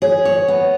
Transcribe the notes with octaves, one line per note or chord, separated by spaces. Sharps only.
G#4 C#5
C#5
B3